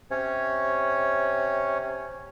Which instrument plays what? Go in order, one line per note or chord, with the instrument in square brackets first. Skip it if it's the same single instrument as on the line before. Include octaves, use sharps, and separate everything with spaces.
[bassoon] C3 [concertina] C#4 C#5